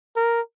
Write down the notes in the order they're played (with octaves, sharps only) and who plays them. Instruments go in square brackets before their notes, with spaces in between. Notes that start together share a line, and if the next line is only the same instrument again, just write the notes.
[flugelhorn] A#4